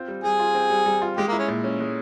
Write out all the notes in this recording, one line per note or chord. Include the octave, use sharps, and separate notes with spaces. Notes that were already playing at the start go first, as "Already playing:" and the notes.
Already playing: C4 F4
G3
G3 G#4
F4
C4
G3
G3
F4
G#3 G4
A#3 E4
C#4
A#2
C#4
G#3